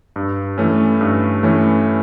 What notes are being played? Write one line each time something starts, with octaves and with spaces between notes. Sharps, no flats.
G2
E3 A3 C#4
G2
E3 A3 C#4